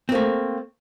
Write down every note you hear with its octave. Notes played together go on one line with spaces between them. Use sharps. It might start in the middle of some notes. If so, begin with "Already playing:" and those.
A3 A#3 C4